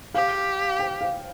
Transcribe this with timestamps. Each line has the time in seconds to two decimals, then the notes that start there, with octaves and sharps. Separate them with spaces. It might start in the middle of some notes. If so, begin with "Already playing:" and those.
0.14 G4 F5
0.79 G5
1.01 F5